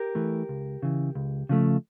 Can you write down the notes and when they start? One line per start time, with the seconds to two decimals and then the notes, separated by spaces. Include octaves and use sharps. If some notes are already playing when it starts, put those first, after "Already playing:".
Already playing: G4 A#4
0.15 E3 A3
0.49 C#2
0.83 C#3 E3
1.15 C#2
1.49 C#3 F3 A3